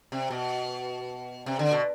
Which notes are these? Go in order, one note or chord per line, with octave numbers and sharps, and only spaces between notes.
C3
B2
C3
D3
B2